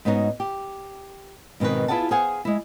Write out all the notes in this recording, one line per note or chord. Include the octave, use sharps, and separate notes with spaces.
G#2 B3 C#4 D#4 F#4
G4
G#2 B2 D#3 C4 B4
B3 E4 F4 G#4 F#5 A5
G#4 C5 F5 F#5 G#5
G#3 E4